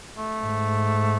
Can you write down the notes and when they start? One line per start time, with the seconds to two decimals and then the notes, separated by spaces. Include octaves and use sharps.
0.18 A3
0.42 G#2